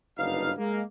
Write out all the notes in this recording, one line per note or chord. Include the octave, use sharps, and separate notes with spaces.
F#1 G2 D3 D#4 B4 F5
G#3 A#3